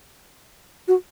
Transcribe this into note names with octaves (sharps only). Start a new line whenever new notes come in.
F#4